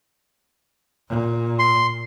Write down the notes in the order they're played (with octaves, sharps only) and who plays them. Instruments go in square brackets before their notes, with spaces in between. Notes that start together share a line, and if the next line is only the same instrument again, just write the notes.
[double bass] A#2
[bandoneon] C6